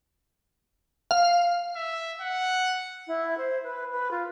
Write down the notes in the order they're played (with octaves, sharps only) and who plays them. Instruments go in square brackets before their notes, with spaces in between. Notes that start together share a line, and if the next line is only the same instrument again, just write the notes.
[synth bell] F5
[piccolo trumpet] E5
F#5
[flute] E4
C5
B4
B4
F4